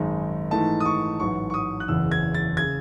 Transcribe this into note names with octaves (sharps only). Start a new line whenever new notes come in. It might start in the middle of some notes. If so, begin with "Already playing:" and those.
Already playing: G#1 F#2 D#3 G#3 D#4
G#2 E3 A3 D#4 A5
D#6
C#6
A1 G#2 F#3 C#6
C#6
D#6
F#6
F#1 E2 C#3 E3 E6
G#6
A6
C#3 G#6